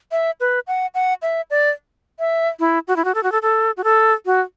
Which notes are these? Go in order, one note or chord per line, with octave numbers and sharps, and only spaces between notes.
E5
B4
F#5
F#5
E5
D5
E5
E4
F#4
E4
F#4
A4
F#4
A4
A4
F#4
A4
F#4